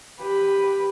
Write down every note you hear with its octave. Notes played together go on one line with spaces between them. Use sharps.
G4 B4